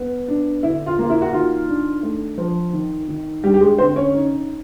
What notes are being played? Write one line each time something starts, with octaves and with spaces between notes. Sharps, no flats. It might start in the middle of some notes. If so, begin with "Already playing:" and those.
Already playing: B3
D4
D3 E4
F4
A#3 F4
E4
F#4
D#3 F4
D4
A3
F3
D#3
D#3
G3 D4 G4
G4
G#3 G#4
D3 C4 C5
C#4 C#5
D#4